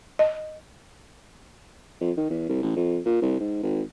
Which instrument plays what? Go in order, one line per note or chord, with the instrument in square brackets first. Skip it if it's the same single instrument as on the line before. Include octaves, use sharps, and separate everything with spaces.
[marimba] D#5
[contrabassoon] F2
D#3
E2
C2
A1
F2
A#2
C2
G#2
G#1